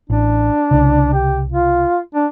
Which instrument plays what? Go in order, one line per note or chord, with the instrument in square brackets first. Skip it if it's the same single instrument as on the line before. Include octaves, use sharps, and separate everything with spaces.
[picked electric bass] A1 [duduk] D4
[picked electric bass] C2 C#3
[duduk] G4
F4
D4